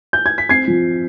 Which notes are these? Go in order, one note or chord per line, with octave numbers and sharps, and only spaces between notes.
G6
G#6
B6
C4 G#6 C7
F3